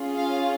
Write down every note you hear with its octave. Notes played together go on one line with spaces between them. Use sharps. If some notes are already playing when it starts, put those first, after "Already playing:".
Already playing: C#4 F4 G#4
F5